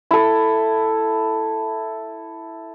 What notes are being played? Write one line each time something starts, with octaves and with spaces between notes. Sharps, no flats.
E4 A4